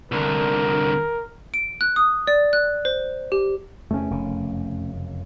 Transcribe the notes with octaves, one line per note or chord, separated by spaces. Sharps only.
C2 D3 A#4
D7
F#6
D#6
D5
F#6
C5
G4
E2 C3 A3 C#4
F1 F#2 C#3